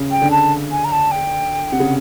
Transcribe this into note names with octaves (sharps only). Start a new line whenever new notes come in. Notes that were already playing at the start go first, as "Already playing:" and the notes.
Already playing: C#3
G5
D3
A5
G#5
A#5
A5
G5
C3 F#5
C#3